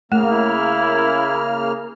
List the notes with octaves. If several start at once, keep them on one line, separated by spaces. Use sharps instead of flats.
C#3 A3 A#3 F6
E4